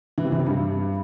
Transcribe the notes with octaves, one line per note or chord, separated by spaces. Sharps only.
E3
C3
E3
C3
G2